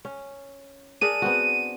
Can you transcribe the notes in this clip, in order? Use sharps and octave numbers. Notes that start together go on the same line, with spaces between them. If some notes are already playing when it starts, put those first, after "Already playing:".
C#4
D4 G#4 A#4 D#7
B3 C4 F#4